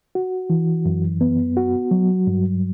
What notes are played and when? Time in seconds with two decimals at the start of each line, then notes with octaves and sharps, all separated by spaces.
0.15 F#4
0.50 E3
0.85 F#2
1.21 B3
1.57 F#4
1.91 F#3
2.27 G2